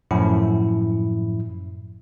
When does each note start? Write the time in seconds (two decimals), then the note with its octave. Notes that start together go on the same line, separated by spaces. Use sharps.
0.11 F#2 A2 F3 E4